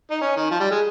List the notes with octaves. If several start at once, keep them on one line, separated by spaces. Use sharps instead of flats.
D#4
C#4
D#3
F3
G3
G#3